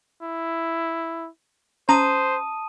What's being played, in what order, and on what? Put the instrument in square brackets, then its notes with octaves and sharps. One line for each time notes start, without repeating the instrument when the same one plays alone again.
[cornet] E4
[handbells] C#4 A#5 [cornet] C5 [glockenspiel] A5 D#6 D#7